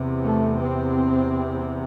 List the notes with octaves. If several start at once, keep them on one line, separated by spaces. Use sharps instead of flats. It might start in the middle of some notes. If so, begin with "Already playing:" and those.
Already playing: E2 C3
A3
C4